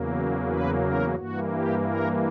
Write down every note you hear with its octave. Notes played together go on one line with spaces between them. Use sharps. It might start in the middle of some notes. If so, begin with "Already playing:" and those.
Already playing: E2 C#3 F#3 A#3
B4
A#4
G2 E3 A#3 F#4
G4
A#4